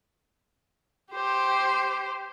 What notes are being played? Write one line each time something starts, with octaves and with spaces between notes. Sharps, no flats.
G4 C5